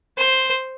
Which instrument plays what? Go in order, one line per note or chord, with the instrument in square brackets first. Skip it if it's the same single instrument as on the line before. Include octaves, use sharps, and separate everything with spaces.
[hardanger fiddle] C5